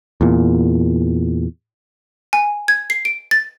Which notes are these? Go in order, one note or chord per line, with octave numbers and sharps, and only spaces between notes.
E2 A#2
G#5
G#6
C7
D7
A6